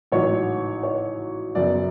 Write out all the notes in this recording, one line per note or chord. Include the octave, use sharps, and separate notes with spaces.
A1 G#2 F#3 C#5
C#5
F#2 C#3 F#3 B3 D5